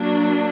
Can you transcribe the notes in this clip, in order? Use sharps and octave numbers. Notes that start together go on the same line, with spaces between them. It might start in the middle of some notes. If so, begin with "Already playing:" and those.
Already playing: F#3 A#3 D4